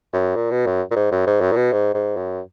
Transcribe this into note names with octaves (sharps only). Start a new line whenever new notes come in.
F#2
A#2
B2
F#2
A#2
G#2
F#2
G#2
F#2
A#2
B2
G#2
G#2
F#2